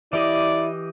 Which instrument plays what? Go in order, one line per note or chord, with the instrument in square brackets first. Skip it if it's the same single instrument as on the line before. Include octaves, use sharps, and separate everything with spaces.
[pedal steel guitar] E3 G4 D#5 [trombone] E4 [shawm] D5